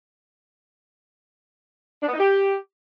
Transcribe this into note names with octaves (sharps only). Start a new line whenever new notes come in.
D4
B3
D#4
G4